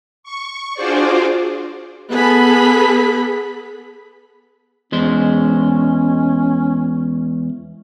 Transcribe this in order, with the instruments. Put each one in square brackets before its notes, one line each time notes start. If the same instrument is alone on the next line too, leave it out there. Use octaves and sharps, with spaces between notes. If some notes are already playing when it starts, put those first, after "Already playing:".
[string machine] C#6
D4 F4 F#4 G#4 C5 D5
[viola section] B3 G#4 A4 B5
[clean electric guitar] E2 G#3 C5 [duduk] C#4